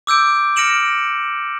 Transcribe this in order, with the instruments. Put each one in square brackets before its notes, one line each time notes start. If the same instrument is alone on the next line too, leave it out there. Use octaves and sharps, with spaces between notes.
[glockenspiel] D6 E6 G6 D7
F6 A#6 C#7 D7 E7 F#7